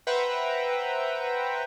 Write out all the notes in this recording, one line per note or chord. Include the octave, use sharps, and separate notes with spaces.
B4 C5 E5 F#5 G5 A#5